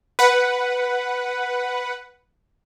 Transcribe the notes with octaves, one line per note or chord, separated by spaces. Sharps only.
B4 F#5